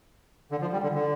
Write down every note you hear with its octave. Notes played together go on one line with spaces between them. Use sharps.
D3
F3
G3
D3
D3